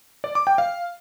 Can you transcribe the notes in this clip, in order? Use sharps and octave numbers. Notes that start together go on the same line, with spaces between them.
D5
D6
G5
F5